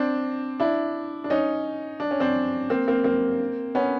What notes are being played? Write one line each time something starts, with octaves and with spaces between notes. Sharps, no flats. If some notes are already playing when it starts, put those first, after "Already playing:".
Already playing: C4 D4
D4 E4
D4
C#4 D#4
D4
C#4
C4 D4
A#3 C4
A#3 C4
A#3 C4
B3 C#4